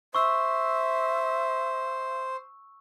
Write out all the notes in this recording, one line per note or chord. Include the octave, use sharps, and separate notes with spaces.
C5 E5 C#6 E6